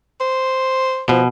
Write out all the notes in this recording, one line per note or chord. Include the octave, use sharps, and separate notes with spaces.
C5
B2 F3